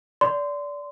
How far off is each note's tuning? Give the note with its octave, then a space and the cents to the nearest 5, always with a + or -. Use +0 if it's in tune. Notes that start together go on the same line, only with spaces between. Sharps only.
D5 -25 C6 -20